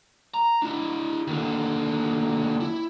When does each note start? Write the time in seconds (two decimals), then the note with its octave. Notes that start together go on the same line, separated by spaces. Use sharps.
0.34 A#5
0.62 D4 E4
1.27 D#2 D3
2.61 E4